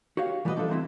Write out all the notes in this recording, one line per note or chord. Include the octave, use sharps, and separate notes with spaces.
F#4 G4 C#5 F5
E3 G3 F#4 G4 B4 D#5
F3 D4 F4 A4 E5
E3 G3 C4 E4